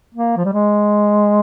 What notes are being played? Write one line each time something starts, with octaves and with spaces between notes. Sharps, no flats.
A#3
F3
G3
G#3